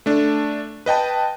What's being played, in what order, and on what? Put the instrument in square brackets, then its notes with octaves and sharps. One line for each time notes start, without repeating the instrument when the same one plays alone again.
[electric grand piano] A3 D4
B4 D#5 G5 A5